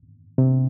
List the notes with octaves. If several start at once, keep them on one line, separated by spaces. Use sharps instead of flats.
C3